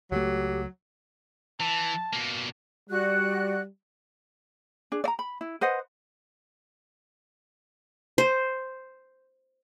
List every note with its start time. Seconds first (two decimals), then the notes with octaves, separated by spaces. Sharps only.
0.12 C#2 F#3 A3 G4
1.60 E3 A5
2.13 B2 A#3
2.90 G3 F#4 D5 F#6
4.92 D4 G#4
5.04 D5 A#5
5.19 B5
5.41 E4
5.61 B4 C5 D#5 F#5
8.18 C5